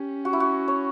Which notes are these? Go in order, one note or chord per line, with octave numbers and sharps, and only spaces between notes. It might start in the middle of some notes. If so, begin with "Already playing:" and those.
Already playing: C#4 G4
F#4
E4
F#4
C#5